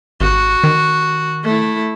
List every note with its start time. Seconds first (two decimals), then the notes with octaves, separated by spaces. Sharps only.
0.21 G#1 F#4
0.64 D#3
1.44 A3 E4